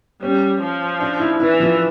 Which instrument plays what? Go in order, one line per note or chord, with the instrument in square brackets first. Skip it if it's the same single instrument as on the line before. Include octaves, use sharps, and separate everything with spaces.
[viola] G3 [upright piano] C#4
[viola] F3
[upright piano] D4
E4
[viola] E3 [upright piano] E4
[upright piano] F3